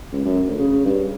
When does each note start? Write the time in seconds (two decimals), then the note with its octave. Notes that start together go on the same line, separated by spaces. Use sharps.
0.12 C#2
0.25 F#2
0.47 D2
0.59 C#3
0.85 G2